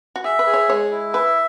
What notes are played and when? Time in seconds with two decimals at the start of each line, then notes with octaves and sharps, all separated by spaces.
0.16 F#4
0.24 G#4 E5
0.39 B4
0.47 G#4
0.54 C#5
0.69 G#3 C#5
0.91 E4
1.13 B4 E5